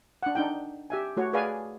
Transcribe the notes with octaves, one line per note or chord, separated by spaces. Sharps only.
D4 F#5
D4 D#4 G5
G4 E5 G#5
A3 F#4 C#5
G#4 B4 D5 F5 G#5